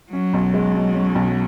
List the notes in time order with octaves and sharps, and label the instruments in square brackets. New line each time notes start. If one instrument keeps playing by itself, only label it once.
[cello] F#3 [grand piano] C#4
[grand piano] B1
G#3
B2
C#4
B1